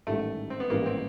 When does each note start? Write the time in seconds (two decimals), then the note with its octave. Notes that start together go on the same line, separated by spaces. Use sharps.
0.07 A1 G#2 D#3 G3 A3
0.50 C4
0.60 B3
0.70 A1 G#2 D#3 G3 A#3
0.86 C4